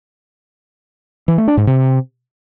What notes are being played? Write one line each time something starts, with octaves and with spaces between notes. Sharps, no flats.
E3
A3
D4
G#2
C3